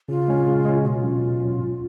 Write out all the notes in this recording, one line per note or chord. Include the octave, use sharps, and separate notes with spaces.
C#3 F4
G#3 C#4
C#3
G#3 C#4
B2 F4 F#4
F#3 C#4
B2
F#3 C#4
G#2